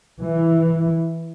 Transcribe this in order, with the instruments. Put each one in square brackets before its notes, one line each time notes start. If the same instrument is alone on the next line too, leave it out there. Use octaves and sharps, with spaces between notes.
[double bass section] E3